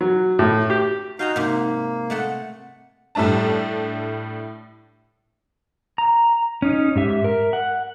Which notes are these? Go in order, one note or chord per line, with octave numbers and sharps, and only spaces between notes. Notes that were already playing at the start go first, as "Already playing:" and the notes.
F#3
A2
G4
D#4 F#4 F5 G#5 A#5 G6
G#2 C3 A#3
G#3 A3 F#5
A2 G3 A3 D4 A5
A#5
C#4 D#4
G#2 G4 E5
A#4 E5
F#5